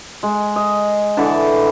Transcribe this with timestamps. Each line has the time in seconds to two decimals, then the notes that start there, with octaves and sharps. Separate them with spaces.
0.23 G#3
0.56 D#5
1.17 D3 E3 B4 A5